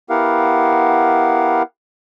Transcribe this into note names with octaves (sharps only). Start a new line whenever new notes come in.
B3 E4 G4 A#4 F5 F#5